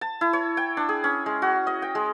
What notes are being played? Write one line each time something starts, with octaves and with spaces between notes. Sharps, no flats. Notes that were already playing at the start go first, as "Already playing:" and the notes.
A5
E4
C#5
G5
D4
G#4
C#4
G#3
F#4
D#5
G5
G#3